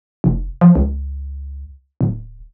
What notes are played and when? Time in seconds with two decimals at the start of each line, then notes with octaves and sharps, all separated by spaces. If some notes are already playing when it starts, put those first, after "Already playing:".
0.24 F1
0.61 F3
0.75 C#2
2.01 D1